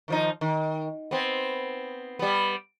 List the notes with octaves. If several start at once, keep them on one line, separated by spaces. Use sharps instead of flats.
D#3 F3 D#4
D#3
B3 C4
G3 B3